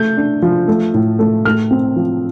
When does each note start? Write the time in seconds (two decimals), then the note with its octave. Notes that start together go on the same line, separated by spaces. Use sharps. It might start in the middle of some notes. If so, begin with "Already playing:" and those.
Already playing: A3 G6
0.17 D4
0.42 F3
0.68 A3
0.94 A2
1.19 A3
1.45 A3 F6
1.71 C4
1.96 F3